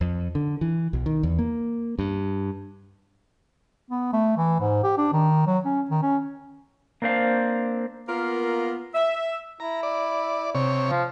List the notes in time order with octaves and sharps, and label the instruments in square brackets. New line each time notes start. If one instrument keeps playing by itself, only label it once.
[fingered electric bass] F2
D3
E3
B1
D#3
E2
A#3
G2
[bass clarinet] B3
A3
E3
G#2
G4
D4
D#3
F#3
C#4
D#3
C#4
[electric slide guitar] A#3 C4 D4 C5 F5
[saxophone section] A#3 B3 F4 A#4
E5
[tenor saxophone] E4 [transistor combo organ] A#5
[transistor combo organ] D5
C3 C#5
[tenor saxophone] F3